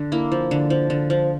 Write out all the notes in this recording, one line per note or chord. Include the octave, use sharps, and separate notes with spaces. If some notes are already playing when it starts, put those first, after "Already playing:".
Already playing: D3 D4
A#3 E4
F3
D3
F3
D3
F3